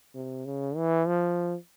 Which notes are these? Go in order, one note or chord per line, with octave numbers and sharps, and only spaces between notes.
C3
C#3
E3
F3